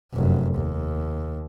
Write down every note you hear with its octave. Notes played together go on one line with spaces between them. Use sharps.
F1 F#2
D#2